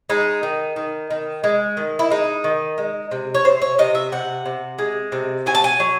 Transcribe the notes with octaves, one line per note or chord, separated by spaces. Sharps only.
G#3 D#4
D#3
D#3
D#3
G#3
D#3
E4
G#3 D#4
D#3
G#3
C3
C#5
C3 C5
C#5
C3 D#5
E5
C3 F#5
C3
G#3
C3
F#3 G#5
A5
G#5
F#3